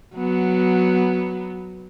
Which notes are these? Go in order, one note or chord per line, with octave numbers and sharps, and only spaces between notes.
F#3 B3